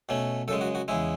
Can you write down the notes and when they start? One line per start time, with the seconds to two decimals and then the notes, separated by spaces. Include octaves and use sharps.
0.09 B2 A3 C#4
0.48 F#2 A4
0.51 C#3 G#3
0.61 F#4
0.75 F#4
0.88 E2 C#3 G#3 E4